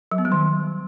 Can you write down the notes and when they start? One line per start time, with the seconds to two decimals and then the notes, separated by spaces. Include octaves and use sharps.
0.12 F#3
0.18 B3
0.25 G3
0.32 D#3